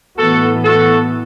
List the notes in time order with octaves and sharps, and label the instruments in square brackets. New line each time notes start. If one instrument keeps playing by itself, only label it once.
[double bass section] A2 E3 B3 [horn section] F#4 A4
[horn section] F#4 A4